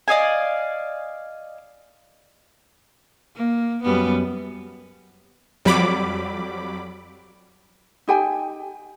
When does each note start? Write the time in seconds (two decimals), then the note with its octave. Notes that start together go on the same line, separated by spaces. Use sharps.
0.08 D5 D#5 F5 G#5
3.36 A#3
3.83 F#2 G3 B3
5.65 F2 F#3 G3 B5 D6
8.08 D#4 G4 G5 G#5